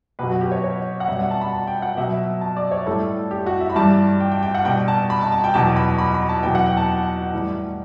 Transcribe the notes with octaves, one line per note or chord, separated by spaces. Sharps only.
B2 F#3 B4
F#4
G4
C#5
C#5
F#5
B2 G3 E5
F#5
A5
B5
A5
G5
F#5
B2 F#3 E5
A5
D5
C#5
A2 G3 A4
G4
F#4
E5
B5
G2 E3 G3 A5
G5
G5
G5
F#5
B2 G3 G5
A5
B5
A5
A5
G5
E2 B2 F#3 A5
B5
B5
B5
A5
E2 B2 F#3 G5
F#5
G5
A5
A2 E3 G3